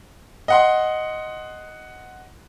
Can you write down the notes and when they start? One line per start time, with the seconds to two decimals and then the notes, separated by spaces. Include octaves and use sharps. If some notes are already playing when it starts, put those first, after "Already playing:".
0.48 D#5 F#5 C6